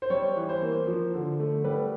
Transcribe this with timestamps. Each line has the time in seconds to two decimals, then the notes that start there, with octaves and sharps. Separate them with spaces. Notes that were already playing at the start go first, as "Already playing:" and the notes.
0.02 C5
0.10 G3 C#5
0.36 E3
0.49 C5
0.62 A#3
0.87 F3
1.14 D3
1.39 A3
1.64 G3 B4